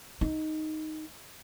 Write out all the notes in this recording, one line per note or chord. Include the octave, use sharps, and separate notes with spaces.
D#4